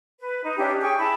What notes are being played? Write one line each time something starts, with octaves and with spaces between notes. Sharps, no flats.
B4
D#4
C#4 D4 E4 G4
G#4 G5 C#6
E4 E5 A5 B5